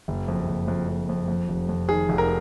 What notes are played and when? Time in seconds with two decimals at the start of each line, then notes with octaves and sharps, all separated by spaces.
0.08 F#1
0.28 F2
0.48 F#1
0.68 F2
0.89 F2
1.09 F2
1.28 F2
1.49 F1
1.69 F2
1.88 D#3 G#4
2.09 F1
2.18 A#4